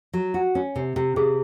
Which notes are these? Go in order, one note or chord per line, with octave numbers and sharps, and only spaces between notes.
F#3
F#4
C#4
C3
C3
C3 G#4